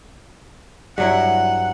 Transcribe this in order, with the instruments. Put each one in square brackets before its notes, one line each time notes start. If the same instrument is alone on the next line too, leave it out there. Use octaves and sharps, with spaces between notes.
[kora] G2 F#3 E4 [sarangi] F#5